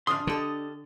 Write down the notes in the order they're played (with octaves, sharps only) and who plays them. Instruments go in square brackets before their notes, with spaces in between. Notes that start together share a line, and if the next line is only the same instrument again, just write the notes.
[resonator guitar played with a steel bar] F2 D3 C#4 [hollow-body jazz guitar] D4 C6 [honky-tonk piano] D#6 F6
[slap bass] D3 [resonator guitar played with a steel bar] G4 A4 D#5